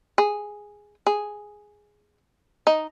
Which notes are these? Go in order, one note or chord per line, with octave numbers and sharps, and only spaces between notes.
G#4
G#4
D#4